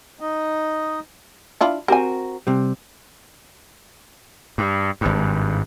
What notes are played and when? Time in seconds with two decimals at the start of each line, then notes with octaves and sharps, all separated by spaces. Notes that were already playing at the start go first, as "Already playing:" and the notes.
0.20 D#4 D#5
1.61 D4 E4 F4
1.88 C4 F#4 G4 A#4 G#5
2.47 C3 G3
4.58 G2
5.01 G#1 G2